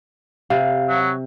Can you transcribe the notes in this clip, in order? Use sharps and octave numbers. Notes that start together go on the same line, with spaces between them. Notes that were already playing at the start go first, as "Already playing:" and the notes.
C3 F5
F#3